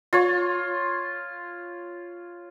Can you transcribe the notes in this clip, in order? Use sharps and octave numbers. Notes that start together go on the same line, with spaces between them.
F4 C#5